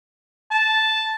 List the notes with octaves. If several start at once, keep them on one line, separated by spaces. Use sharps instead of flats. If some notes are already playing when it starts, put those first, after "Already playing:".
A5